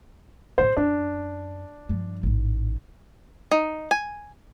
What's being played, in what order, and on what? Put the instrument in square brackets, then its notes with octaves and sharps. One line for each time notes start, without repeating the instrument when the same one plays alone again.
[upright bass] A2 A#3 [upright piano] C5
[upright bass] F#2 [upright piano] D4
[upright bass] G2 F3
A1 G#2
[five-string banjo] D#4
G#5